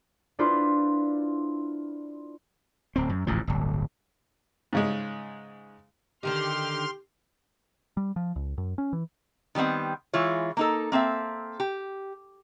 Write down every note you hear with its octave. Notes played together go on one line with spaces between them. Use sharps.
D4 E4 F4 B4 C5
D1 C4
F#2
D1 A1 G#2 F3
D1 G1
G#2 C#3 G#3
D3 D#3 D#4 G4 C6 F6
G3
F3
C#2
F#2
C#4
E3
D#3 G3 B3 C4 F#5
E3 G#3 E4 F4 C#5
A#3 D#4 A4
A#3 C4 A4 E5
G4